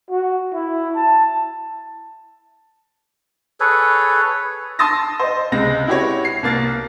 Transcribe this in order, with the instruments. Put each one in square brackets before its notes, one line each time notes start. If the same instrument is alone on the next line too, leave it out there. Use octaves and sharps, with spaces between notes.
[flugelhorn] F#4
E4
A5
[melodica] G#4 A4 B4 C#5
[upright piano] A5 C6 D#6 E6 A6 A#6
C5 D#5
C#2 C3 G#3 A#6
E4 F#4 G4 B4 C#5
C7
C2 A#3 A6